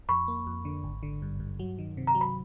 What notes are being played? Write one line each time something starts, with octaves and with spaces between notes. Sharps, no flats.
F2 B5 C#6
A#3
F2
D3
G#1
D3
G2
G2
F#3
D#3
C3
A#5
F#3
B5